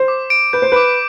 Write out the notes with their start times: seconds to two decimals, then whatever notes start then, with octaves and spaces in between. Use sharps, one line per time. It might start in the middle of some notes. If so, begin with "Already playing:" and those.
Already playing: C5
0.08 D6
0.30 D7
0.53 B4 G6
0.62 C5
0.72 B4 D6